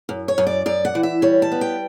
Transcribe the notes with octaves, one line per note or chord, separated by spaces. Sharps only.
F#2
C#5
F#2
D5
F#2 D5
F#5
E3
E5
G3 C#5
A5
B3
G5